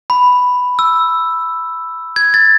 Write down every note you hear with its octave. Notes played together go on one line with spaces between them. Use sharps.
B5
E6
G#6
A6